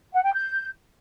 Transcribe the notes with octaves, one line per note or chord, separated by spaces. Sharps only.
F#5
G5
G6